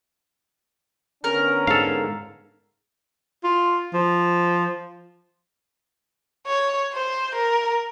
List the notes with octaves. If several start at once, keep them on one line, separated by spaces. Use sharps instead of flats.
D3 B3 C#4 A#4
G#2 A4 F5
F4
F3
C#5
C5
A#4